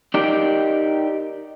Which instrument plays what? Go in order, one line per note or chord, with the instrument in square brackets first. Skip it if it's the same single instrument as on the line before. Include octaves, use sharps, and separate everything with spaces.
[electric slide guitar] D#4 G4 A#4 D5